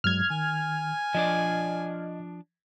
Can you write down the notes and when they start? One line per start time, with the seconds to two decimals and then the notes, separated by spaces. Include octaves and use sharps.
0.04 G2 F#3 G#3 F6 G#6
0.30 D#3 G#5
1.14 F3 D4 D5 D#5